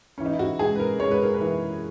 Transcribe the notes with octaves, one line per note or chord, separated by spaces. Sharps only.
C#4
E3
D#4
E4
F#4
G#3 G#4
B4
A#4
G#3 C#5
B4
A#4
B4
E3